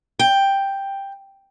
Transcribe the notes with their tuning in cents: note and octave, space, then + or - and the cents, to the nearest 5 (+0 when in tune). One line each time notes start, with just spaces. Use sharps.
G5 +5